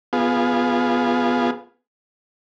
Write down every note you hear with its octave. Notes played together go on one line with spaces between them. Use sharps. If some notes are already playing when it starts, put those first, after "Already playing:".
B3 F4 G#4